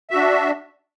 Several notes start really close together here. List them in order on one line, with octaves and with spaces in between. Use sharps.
E5 F#4 D4